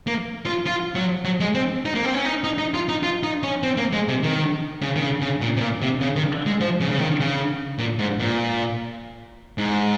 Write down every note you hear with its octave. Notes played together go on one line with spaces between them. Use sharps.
A#3
F4
F4
F#3
F#3
G#3
C4
D#4
A#3
C4
C#4
D#4
D#4
D#4
F4
D#4
F4
D#4
C#4
C4
A#3
G#3
C3
D#3
C#3
D#3
C#3
C#3
A#2
C3
A#2
C3
C#3
D#3
G#3
F3
C#3
C#3
D#3
C#3
A#2
G#2
A#2
G#2